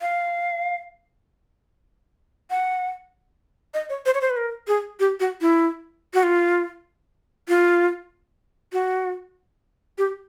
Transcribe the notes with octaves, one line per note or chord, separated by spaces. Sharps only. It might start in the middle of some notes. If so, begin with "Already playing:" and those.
F5
F#5
D#5
C#5
C5
C#5
C5
B4
A#4
G#4
G4
F#4
E4
F#4
F4
F4
F#4
G4